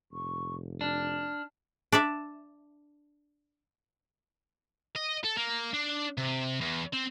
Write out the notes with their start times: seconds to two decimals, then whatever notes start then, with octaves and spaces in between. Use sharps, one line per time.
0.12 F1 C#6
0.81 D4 F6
1.92 D4 D5 E5
4.96 D#5
5.24 A4
5.36 A#3
5.74 D4
6.18 C3
6.61 E2
6.94 C4